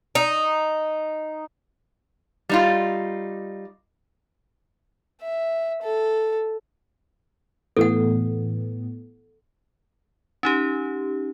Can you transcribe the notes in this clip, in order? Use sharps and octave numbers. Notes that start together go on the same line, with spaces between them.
D#4
G3 D#4 F4
E5
A4
A2 E3 B3 A4 F#5
C#4 D#4 G4